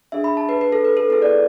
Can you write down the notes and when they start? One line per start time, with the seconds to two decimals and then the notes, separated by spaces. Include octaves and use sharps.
0.12 D4 G#4 E5
0.24 B5
0.37 A5
0.49 B4
0.61 B4
0.72 A4
0.85 B4
0.97 A4
1.10 B3 E4 G#4 B4
1.22 D5